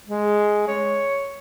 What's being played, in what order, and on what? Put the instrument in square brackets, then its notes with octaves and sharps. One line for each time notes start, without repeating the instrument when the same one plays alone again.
[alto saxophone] G#3
C#5